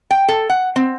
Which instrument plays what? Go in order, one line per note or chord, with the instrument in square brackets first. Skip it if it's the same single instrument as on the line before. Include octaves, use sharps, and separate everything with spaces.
[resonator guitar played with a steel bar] G5
A4
F#5
C4